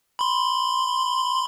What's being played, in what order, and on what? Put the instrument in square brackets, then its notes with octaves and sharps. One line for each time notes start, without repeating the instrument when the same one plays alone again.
[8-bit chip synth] B5 C6